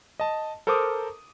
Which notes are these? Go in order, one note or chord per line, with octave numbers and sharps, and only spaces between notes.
D#5 A5
A4 A#4 C5 A#5 D6 D#6